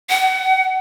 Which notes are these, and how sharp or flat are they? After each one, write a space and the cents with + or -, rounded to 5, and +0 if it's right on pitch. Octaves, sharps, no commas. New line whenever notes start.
F#5 +35